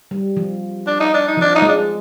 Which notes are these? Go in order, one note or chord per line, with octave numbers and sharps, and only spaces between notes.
G3
F3
D4
D#4
D4
D#4
F3
D4
D#4
G#3
D4